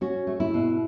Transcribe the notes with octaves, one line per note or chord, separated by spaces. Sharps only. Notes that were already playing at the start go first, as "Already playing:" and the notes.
C#4 F#4
A3
E4
B2